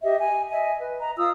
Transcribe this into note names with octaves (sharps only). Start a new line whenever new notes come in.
G4 D#5 E5
G#5
D#5 E5 G#5
B4
D#5 A#5
F4 D#6 E6